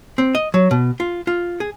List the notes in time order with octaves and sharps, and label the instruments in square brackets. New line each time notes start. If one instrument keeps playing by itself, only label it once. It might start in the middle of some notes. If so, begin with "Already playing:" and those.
[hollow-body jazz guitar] C4
D#5
F#3
B2
F4
F4
G#4